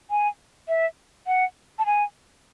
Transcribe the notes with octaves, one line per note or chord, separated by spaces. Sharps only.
G#5
E5
F#5
A5
G#5